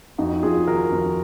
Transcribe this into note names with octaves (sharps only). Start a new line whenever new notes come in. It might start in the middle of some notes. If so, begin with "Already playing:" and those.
F2 D#4 F#4
F2 F4 G#4
D#3 F#4 A#4
F2